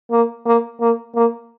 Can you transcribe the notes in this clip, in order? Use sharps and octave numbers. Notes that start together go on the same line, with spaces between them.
A#3
A#3
A#3
A#3